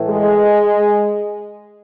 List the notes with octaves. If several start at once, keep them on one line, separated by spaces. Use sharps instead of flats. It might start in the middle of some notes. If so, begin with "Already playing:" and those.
Already playing: A2 E3
G#3